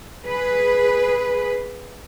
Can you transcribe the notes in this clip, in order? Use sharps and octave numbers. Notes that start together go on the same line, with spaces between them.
G#4 B4